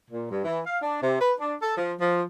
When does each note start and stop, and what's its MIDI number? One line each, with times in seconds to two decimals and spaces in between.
0.11 0.29 46
0.31 0.44 43
0.45 0.60 52
0.66 0.79 77
0.82 1.00 62
1.03 1.18 48
1.21 1.33 71
1.39 1.56 62
1.62 1.77 69
1.77 1.94 53
2.00 2.23 53